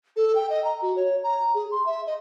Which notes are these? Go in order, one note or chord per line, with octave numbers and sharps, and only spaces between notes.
A4
G5
D#5
A#5
F#4
C#5
A#5
G#4
C6
E5
D#5